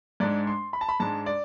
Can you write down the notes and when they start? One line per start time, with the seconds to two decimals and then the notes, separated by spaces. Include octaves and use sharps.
0.20 G#2 G#3 D4 D5
0.47 C6
0.73 B5
0.81 A5
0.89 B5
1.00 G#2 G#3 D4 A5
1.26 D5